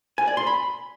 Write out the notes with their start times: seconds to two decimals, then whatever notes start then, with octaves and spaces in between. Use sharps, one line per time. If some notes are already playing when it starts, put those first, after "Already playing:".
0.18 G#5
0.28 D5
0.37 C6
0.47 B5